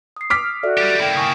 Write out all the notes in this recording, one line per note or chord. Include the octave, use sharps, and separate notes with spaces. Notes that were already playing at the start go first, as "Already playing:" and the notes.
D#6 C7
D6 F6 B6
F#4 A4 D5 E5
G3 G4
A#3 E4 G5
G#5 C#6 D#6